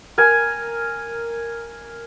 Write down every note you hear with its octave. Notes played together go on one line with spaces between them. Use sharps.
A#4 G#5